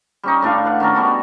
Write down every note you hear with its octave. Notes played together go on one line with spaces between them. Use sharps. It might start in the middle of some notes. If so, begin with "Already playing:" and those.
G3 C#4 D#4
A2 D4 D5 F5
B4 F#5
D#3 C#4 D4 A#4
G3 B3 F#4 D5